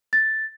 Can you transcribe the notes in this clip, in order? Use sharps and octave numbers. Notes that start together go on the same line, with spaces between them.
A6